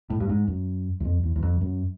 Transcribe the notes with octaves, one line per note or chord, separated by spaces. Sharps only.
A2
G2
G#2
F#2
E2
F2
E2
E2
F2
F#2